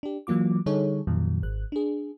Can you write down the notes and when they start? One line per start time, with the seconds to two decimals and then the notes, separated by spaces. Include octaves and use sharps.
0.03 D4 G4
0.27 E3 F#3 A#3 F4 D6
0.66 D3 G3 D#4 G#4 A4 C#5
1.07 F2 A#2 D#3 F#3
1.43 G#1 F#6
1.72 D4 G#4